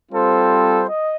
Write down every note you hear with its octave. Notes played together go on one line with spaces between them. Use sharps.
G3 C4 F4 A4 C5
D#5